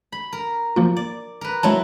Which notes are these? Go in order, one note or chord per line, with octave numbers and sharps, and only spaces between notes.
B5
A#4
F3 A#3 F4
D5
A#4 B4
F#3 G#3 C4 E4 C#5 A5